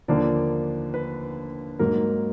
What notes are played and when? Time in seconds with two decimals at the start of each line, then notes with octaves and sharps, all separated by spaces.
0.08 D#2 D3 F3 A#3 D5
0.94 B4
1.79 G#2 F#3 A#3 A#4